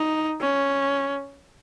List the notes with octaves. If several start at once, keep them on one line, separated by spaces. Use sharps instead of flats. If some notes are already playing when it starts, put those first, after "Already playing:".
Already playing: D#4
C#4